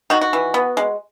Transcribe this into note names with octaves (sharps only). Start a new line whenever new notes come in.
D#3 F#4
F#4
E3
B3
G#3